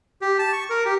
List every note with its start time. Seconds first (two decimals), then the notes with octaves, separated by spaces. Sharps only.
0.21 G4
0.39 A5
0.53 C#6
0.70 A#4
0.85 G4